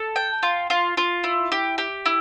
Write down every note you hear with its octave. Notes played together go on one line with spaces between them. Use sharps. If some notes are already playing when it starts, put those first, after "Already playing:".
Already playing: A4
G5
F4
F4
F4
E4
G4
G4
E4